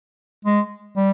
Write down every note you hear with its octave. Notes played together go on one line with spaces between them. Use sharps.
G#3
G3